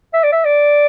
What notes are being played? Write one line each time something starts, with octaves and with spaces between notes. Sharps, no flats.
E5
D5
E5
D5